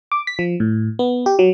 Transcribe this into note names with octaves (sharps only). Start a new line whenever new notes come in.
D6
B6
F3
A2
B3
G4
F#3